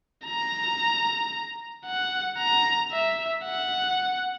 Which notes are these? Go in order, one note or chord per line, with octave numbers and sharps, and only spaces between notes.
A#5
F#5
A#5
E5
F#5